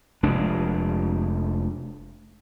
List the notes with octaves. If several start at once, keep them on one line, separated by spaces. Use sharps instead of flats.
F1 G#3 D4